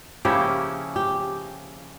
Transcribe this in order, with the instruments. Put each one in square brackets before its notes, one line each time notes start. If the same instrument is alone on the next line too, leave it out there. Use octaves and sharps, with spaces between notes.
[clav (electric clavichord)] C#3 F3 A#3 C#4 E4 [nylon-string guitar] G4
[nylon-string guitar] G4